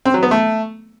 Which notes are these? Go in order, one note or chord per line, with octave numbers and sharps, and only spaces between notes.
C4
F#3
B3
A3